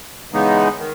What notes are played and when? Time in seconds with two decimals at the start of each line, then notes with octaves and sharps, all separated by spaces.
0.33 C#3 E3 G#3 B3 D#4
0.78 D#3